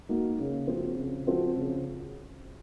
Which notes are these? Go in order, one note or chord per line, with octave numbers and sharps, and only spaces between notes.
A#3 D#4 F#4
C#3
F3 C4 F#4
C#3
F3 C4 F#4
C#3